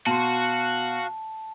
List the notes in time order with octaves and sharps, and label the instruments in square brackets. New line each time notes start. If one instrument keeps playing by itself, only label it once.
[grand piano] B2 C6 [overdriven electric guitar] F#4 [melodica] F5 [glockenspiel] A5